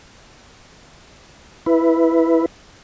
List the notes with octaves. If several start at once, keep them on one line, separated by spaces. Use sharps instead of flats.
E4 B4